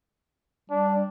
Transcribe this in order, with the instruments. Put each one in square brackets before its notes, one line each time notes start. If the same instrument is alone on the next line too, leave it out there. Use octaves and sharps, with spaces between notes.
[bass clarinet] G3 [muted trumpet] D4